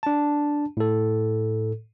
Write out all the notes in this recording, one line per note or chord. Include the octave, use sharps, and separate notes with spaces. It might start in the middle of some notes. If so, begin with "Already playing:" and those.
D4 A5
A2 A4